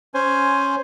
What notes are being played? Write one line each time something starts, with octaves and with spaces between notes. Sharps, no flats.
C#4 C5 G#5